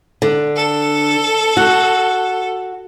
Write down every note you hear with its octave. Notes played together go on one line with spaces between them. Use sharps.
D3
A4
F#4